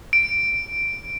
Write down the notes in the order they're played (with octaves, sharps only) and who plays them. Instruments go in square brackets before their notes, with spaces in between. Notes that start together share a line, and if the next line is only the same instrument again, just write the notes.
[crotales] D7